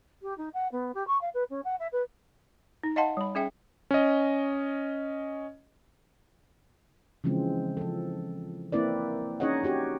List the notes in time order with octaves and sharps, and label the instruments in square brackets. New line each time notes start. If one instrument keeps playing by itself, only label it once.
[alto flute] G4
D#4
F#5
B3
G4
C#6
F5
B4
C#4
F#5
E5
B4
[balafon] D#4
D#5 F5 F#5 A5 C6
G3 B5
C#4 G#4 E5 G5
[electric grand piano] C#4 D#5
[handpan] C#3 E3 F3 G#3 C4
F3 A4
A#3 C4 E4 B4 D5
C#4 D#4 G#4 C#5 D#5 F#5
D#4 F#4 G4 C#5